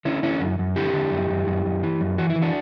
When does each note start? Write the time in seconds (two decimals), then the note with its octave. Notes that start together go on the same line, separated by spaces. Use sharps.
0.05 D3 C#4 E4
0.23 D3 C#4 E4
0.41 F#2
0.59 F#2
0.76 D3 E4 G4
0.94 D3
1.12 F#2
1.30 F#2
1.47 F#2
1.65 F#2
1.83 E3
2.01 F#2
2.18 E3 F#4
2.30 E4
2.36 E3
2.41 D4 F#4